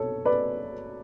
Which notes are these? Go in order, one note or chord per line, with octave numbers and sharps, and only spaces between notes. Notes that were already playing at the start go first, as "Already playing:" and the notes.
Already playing: B2 A4 C#5
B4 D5